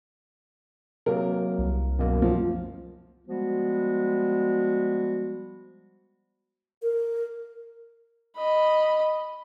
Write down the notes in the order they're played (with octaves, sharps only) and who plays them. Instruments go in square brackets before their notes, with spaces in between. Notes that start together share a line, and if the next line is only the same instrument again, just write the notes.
[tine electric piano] C3 F#3 A#3 [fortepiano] A#4
[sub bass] C2
[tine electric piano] F#2 B2 A#3
[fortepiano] F3
[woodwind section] F3 G3 G#3 B3 F#4
[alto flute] A#4
[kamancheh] D#5 B5